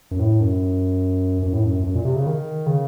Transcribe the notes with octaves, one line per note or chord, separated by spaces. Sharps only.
F#2
A2
F#2
F#2
A2
F#2
F#2
A#2
C3
C#3
D#3
C#3